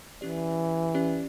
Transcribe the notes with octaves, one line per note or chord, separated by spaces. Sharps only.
E3 C#4 G4 D5
C#4 G4 D5